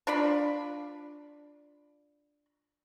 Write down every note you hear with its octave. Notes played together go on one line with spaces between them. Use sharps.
D4 F4 D5 B5